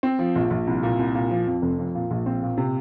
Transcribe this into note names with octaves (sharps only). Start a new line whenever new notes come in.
C4
F3
A#1
A#1
C2
A#2
C2
A#2
F3
F2
F1
F2
A#2
A#1
C4
A#2
C3